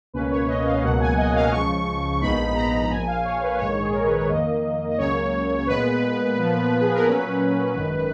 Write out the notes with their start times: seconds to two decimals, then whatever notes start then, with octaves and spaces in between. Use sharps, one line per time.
0.14 C#2 B2 A#3 C#4 B4
0.31 C#5
0.48 D#5
0.65 F5
0.82 C#2 B2 F#3 A#3 F#5
1.00 G#5
1.17 D#5
1.35 F5
1.52 C#2 C#3 F3 C#6
2.21 A#1 G#2 F3 B3 D#4 B5
2.46 B5
2.55 A#5
2.90 A#1 A#2 F3 G#5
3.08 F5
3.25 C#5
3.43 B4
3.59 A#1 G#2 D#3 G#3 C#5
3.81 G#4
3.93 A#4
4.04 B4
4.17 C#5
4.28 F2 D#3 A#3 D#5
4.91 D#5
4.98 C#2 C#3 F#3 A#3 C#4 C#5
5.57 C#5
5.67 A#2 G#3 B3 B4
6.37 A#2 F3 B3
6.81 G#4
6.94 A#4
7.05 A#2 F#3 C#4 B4
7.75 G#1 F#2 D#3